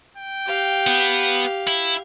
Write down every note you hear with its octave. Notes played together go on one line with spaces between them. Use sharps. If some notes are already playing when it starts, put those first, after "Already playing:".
G5
G4 F5
B3
E4